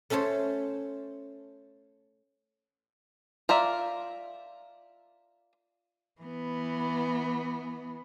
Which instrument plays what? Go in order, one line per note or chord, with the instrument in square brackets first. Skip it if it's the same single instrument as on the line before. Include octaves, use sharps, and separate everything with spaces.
[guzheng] A3 C#4 A4 C5 C#5
[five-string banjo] F4 A#4 D5 E5
[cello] E3 B3